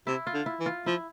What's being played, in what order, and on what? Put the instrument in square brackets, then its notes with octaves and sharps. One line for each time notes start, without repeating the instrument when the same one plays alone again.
[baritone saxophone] C3 [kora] E4
[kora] F4
[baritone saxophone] D3
[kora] E4
[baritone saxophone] E3
[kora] F4
[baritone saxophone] F3 [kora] E4